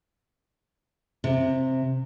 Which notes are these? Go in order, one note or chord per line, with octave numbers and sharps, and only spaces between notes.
C3